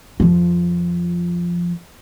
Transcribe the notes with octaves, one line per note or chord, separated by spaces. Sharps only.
F2 F3